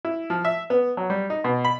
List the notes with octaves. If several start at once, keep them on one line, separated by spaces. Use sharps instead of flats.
E4
F3
E5
B3
F#3
G3
D#4
B2
B5